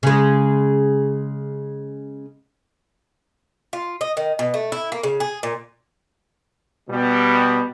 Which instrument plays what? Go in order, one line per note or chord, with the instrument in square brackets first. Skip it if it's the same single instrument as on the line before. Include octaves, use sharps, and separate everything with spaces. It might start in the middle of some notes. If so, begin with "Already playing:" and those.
[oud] C#3 G#3
[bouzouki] F4
D#5
D#3
B2
A3
E4
A#3
C#3
G#4
A#2
[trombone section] B2 G3